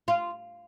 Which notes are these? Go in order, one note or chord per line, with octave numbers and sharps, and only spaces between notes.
F4